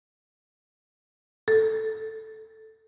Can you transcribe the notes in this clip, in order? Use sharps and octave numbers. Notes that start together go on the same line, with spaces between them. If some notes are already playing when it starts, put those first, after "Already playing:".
A4